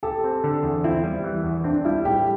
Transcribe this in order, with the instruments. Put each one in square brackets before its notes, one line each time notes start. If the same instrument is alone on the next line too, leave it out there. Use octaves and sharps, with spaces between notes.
[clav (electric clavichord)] G4 [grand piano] A4
[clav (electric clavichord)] C4
D3
E2
[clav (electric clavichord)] C4 [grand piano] E4
[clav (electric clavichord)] G3
E3
E2
[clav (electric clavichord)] C4 [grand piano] D4
[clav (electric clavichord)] G3 [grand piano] E4
[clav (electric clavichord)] A2 [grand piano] G4